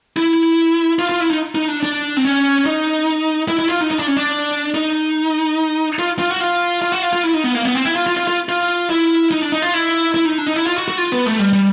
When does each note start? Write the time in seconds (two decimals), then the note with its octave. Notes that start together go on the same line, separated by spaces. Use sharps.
0.17 E4
0.99 F4
1.09 F4
1.20 E4
1.30 D#4
1.55 D#4
1.68 D4
1.83 D4
2.17 C4
2.25 C#4
2.66 D#4
3.48 E4
3.59 E4
3.69 F4
3.81 D#4
3.91 D#4
3.99 D4
4.07 C#4
4.17 D4
4.74 D#4
5.99 F4
6.19 F4
6.30 F#4
6.40 F4
6.82 F4
6.92 F#4
7.02 F4
7.13 F4
7.24 E4
7.34 D#4
7.44 B3
7.55 A#3
7.65 B3
7.75 C4
7.85 E4
7.96 F4
8.07 F4
8.17 F4
8.28 F4
8.49 F4
8.90 E4
9.31 D#4
9.42 D4
9.52 D#4
9.62 F4
9.74 E4
10.14 E4
10.25 D#4
10.38 D4
10.47 D#4
10.56 E4
10.67 F4
10.78 F#4
10.88 F#4
10.98 F4
11.12 B3
11.26 A3
11.39 G3
11.53 G3